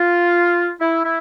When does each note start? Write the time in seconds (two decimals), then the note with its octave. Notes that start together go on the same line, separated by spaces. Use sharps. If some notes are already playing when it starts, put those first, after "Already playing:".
Already playing: F4
0.80 E4
1.04 E4